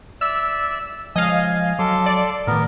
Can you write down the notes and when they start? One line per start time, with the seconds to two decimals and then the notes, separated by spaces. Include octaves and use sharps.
0.21 D5 E5 E6
1.16 F3 G#3 D#5 F5 G#5
1.79 F#3 A4 C6 D6
2.06 D5
2.47 A2 D#3 B3 A#4